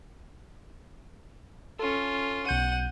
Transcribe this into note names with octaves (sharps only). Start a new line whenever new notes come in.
C#4 F4 A4
B1 F#5 G6 D#7